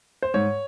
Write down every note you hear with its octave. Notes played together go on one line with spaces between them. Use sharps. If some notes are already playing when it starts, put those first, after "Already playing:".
C5
G#2 C#5